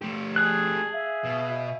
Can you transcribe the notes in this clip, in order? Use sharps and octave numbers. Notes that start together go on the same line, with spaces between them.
A3 G4
G#4 G#5 A5 F#6
E5 F5 G#5
B2